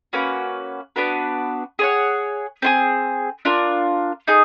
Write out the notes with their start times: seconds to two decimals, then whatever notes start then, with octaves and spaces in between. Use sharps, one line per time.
0.13 A#3 C#4 F#4 B4
0.96 B3 D4 F#4 B4
1.79 G#4 C#5 F#5
2.62 C4 F4 G#4
3.45 D4 F4 A#4
4.27 D#4 G#4